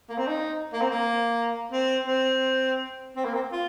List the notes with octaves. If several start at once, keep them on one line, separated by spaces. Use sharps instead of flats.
A#3
C4
D#4
A#3
C4
A#3
C4
C4
C4
A#3
C4
F4